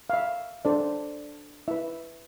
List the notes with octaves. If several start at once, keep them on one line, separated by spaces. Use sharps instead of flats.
F5
E5
D4 A4 C5 D5
E4 B4 E5